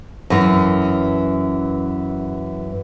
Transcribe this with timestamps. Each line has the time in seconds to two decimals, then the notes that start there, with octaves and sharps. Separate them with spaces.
0.30 F#2 E3